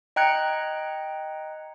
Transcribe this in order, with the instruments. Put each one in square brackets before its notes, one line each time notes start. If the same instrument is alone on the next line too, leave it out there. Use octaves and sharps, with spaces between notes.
[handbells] D#5 G5 A#5 F#6 G#6 C#7